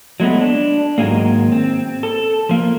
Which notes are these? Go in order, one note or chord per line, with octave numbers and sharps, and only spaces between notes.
F#3 G#3 A3 B3
D4
G#2 D#3 F3 F#3 G#3 A#3
C4
A4
F3 A#3